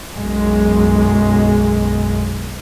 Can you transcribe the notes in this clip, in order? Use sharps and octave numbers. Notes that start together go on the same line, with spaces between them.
B1 F#2 G#3